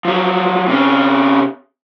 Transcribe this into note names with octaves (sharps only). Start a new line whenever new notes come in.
F3 F#3
C3 C#4